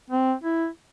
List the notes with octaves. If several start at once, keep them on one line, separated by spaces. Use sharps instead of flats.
C4
E4